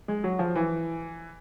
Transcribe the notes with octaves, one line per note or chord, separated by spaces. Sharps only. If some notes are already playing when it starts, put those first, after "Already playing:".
G#3
F#3
F3
E3